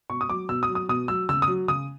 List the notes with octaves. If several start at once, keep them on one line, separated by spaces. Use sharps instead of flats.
B2 C#6
D#6
F#3 D6
B2 E6
D#6
F#3
D#6
B2 D#6
F#3 E6
C#3 E6
D#6
F#3
C#3 D#6